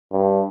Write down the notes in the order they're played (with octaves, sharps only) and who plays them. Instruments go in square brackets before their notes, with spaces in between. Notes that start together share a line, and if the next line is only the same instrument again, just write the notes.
[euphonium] G2